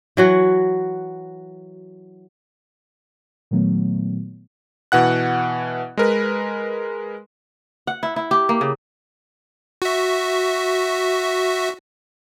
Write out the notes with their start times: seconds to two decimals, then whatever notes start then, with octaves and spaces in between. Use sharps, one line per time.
0.17 E3 F#3 F#4
3.51 A#2 D#3 F#3 A3 B3
4.92 B2 E3 F#5 F#6
5.97 G#3 A#4 B4
7.87 F#5
8.03 E4
8.16 E4
8.31 G4
8.49 A#3
8.61 C#3
9.82 F#4 E5